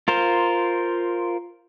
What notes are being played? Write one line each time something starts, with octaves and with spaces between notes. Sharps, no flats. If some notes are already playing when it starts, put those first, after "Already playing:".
F4 A#4 C5